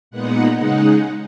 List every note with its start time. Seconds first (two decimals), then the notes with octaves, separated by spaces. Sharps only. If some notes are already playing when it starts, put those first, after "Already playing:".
0.11 A#2 G#3 B3 D#4 F#5
0.56 C#3 G#3 D#4 F#5